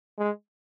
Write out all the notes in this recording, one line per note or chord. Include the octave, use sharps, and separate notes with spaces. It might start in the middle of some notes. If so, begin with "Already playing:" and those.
G#3